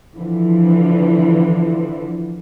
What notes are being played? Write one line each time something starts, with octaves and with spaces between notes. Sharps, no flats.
D3 E3 F3